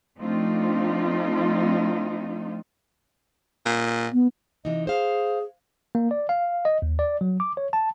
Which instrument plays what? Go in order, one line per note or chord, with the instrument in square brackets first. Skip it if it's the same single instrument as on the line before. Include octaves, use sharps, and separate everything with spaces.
[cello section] F3 A3 C4 D4 D#4 F4
[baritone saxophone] A#2
[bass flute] B3
[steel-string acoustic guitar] C3 E3 D#4 [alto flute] D#5
[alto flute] G#4 [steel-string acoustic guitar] C5 F5
[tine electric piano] A#3
D5
F5
D#5
D#2
D5
F#3
D6
C#5
A5